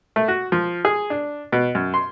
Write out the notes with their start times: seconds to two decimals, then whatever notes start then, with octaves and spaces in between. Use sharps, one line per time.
0.16 A3
0.28 F#4
0.52 F3
0.85 G#4
1.10 D4
1.52 B2
1.75 F#2
1.94 C6